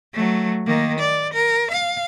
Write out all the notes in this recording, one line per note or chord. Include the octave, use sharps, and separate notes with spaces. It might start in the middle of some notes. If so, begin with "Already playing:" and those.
F#3 A3
D#3 A#3
D5
A#4
F5